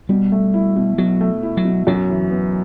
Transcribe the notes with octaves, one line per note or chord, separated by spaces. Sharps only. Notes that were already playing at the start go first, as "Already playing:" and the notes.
B2 G3
A3
E4
B2
B2 F#3
A3
E4
F#3
B2
F#2 F#3
E3
B3